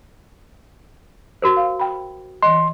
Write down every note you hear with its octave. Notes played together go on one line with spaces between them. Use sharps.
F#4 A#4 C5
F5
G5 B5
E3 D#5 C6